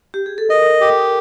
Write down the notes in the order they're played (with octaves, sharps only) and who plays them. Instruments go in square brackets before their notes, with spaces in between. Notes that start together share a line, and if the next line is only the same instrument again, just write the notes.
[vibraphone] G4
G#4
A4
[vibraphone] A#4 [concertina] D#5
[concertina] G4